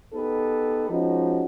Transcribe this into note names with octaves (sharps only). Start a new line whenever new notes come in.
B3 D#4 G4 A4 B4
F3 G#3 C#4 D#4 F#4